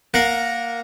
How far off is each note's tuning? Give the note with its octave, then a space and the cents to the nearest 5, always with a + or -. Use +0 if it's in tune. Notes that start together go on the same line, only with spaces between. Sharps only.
A#3 +0 A#4 +0 F#5 -15